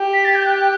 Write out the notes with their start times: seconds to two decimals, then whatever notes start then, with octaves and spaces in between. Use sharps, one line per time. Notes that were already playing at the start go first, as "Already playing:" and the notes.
Already playing: G4
0.13 B6
0.25 A6
0.35 G6
0.46 F#6